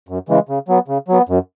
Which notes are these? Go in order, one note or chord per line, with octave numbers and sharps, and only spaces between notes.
F#2
C#3 E3 G#3
C#3
F#3 B3
C#3
F#3 B3
F#2